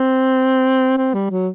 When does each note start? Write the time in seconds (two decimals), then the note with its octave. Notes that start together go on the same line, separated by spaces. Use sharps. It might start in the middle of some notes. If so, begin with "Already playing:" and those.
Already playing: C4
0.97 C4
1.14 G3
1.31 F#3